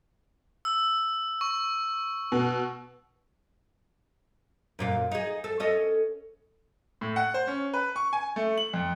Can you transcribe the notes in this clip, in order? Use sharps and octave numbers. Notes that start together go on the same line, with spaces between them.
E6
C#6
B2
F#2 A#2 F5
D#4 G#4
A4
C#4 A4 D#5
A2
F#5
C5
C#4
B4
C#6
G#5
A3
F#7
F2